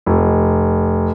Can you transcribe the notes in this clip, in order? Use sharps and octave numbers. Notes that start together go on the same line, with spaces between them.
F1